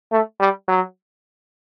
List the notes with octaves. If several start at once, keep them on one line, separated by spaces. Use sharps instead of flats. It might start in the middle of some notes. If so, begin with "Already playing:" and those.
A3
G3
F#3